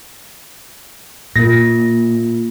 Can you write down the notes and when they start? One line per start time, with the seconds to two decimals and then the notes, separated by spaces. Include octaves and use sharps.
1.36 A#2 A#3 F4 A#6